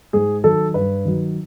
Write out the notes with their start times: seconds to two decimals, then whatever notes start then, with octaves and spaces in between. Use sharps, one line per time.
0.13 G#2 G#4
0.44 D#3 F#3 A4
0.74 G2 B4
1.05 D#3 F#3